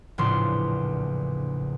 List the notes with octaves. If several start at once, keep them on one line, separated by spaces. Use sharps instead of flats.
A#1 E2 A2 C#3 D4 C6